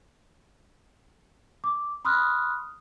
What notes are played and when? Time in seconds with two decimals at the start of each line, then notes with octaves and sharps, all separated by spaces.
1.64 D6
2.05 B5 C6 D#6 F6 F#6